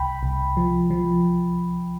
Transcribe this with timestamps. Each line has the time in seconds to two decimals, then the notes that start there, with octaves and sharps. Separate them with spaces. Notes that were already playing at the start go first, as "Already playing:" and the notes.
Already playing: C2 G5 B5
0.23 C2
0.57 F3
0.90 F3